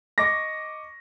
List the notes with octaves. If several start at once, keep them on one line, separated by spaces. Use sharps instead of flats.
D#5 C#6 D6 A#6